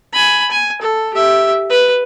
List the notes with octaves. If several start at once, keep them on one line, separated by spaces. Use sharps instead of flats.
G#5 B5
G#5
A4
G4 E5
B4